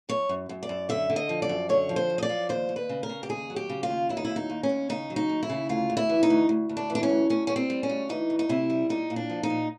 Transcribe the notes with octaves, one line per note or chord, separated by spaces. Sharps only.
F#2 C#5
F#2
F#2
D5
F#2
D3 E5
D3
D#5
F3
D5
F#2
D3 C#5
F3
C5
F#2
D#5
D5
F3
D#2 C5
D#2
B4
C#3
A#4
C#3
G4
D#2 G#4
F#3
G4
C#3
F4
D#2
F#3 E4
D#4
D#2 E4
D#4
D#2
C#4
D#2
C#3 D#4
F#3
D#4
D#2
E4
C#3
D2 F4
D2
E4
E3
D#4
D2
D2
D2
D4
E3
D4
C#4
D2
D2 C#4
G3 C#4
C4
G3
C#4
D2
E3 D#4
D2
D#4
C3 E4
G3
A#2 D#4
A#2
D4
F3
D#4
A#2